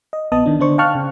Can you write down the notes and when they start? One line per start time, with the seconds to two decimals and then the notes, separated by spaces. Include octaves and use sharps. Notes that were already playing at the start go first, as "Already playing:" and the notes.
0.13 D#5
0.32 A#1 B3 D#5 A5 D#6
0.46 D#3 D4
0.60 D3 D4 C5 C#6
0.78 F5 G5 A5 C#6 F6 F#6
0.95 C#3